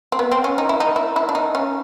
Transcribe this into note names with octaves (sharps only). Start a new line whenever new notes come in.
C4
B3
C4
C#4
D#4
E4
D#4
E4
E4
D4
D#4
C#4